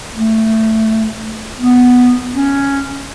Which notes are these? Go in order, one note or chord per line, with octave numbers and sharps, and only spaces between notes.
A3
B3
C#4